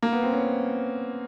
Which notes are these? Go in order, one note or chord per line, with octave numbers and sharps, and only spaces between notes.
A#3
B3
C4
C#4